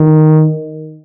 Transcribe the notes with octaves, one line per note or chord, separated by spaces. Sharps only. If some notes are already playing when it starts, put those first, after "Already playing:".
Already playing: D#3